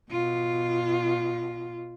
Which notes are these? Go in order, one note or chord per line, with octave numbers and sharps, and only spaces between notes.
B2 F4